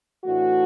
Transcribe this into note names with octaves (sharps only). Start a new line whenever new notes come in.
A2 E3 A3 D4 F#4